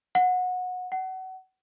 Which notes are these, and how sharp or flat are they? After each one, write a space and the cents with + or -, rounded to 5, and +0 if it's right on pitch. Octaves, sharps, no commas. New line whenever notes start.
F#5 -20
F#5 +30